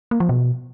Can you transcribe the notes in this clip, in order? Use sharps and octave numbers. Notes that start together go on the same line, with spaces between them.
A#3
F3
B2